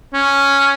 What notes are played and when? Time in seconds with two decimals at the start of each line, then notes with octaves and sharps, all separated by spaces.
0.13 C#4